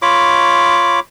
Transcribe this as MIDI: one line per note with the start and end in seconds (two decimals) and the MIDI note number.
0.02 1.00 65
0.02 1.00 73
0.02 1.00 83
0.02 1.00 86